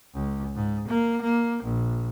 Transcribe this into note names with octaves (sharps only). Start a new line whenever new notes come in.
C#2
G#2
A#3
A#3
A#1